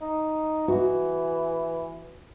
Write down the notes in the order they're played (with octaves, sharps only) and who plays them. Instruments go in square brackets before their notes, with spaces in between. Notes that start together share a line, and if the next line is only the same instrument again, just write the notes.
[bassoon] D#4
[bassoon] E3 [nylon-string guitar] F#4